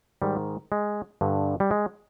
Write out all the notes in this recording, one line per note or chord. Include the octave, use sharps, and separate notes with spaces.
G#2 D#3 G3
G#3
G2 D3
G3
G#3